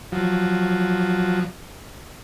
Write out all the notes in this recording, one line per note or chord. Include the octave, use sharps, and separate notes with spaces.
F3 F#3